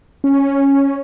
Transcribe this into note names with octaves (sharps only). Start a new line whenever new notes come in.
C#4